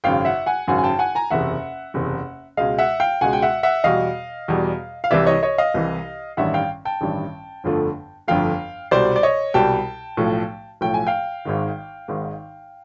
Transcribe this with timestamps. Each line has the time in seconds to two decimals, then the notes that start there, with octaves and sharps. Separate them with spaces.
0.04 G#1 F#2 C#3 F5 G5
0.25 E5 F#5
0.46 F#5 G#5
0.68 G#1 F#2 C#3 F#5 G#5
0.78 G#5
0.84 G5 A5
0.99 F#5 G#5
1.15 G#5 A#5
1.31 F#1 E2 C3 E5 F#5
1.94 F#1 E2 C3
2.57 C#2 B2 G#3 D#5 F5
2.78 E5 F#5
3.00 F5 G5
3.21 C#2 B2 G#3 F#5 G#5
3.33 G5
3.42 E5 F#5
3.63 E5 F#5
3.84 E2 B2 G3 D#5 F5
4.48 E2 B2 G3
5.04 F5
5.11 C2 C3 E3 D5 E5
5.26 C#5 D#5
5.43 C#5 D#5
5.58 D#5 F5
5.74 C2 C3 E3
6.37 A1 G2 D#3 G3 E5 F#5
6.54 F5 G5
6.85 G5 A5
7.01 A1 G2 D#3 G3
7.64 G1 F2 D3 F3 A3
8.28 G1 F2 D3 F3 A3 F5 G5
8.91 C2 B2 G3 C5 D5
9.16 D5
9.23 C#5 D#5
9.54 C2 B2 G3 G5 A5
10.17 B1 A2 F3
10.81 B1 A2 F3 G5
10.94 G#5
11.07 F5 G5
11.45 G#1 G#2 D#3
12.08 G#1 G#2 D#3